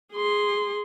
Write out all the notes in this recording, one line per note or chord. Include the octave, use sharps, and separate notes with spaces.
G#4 C6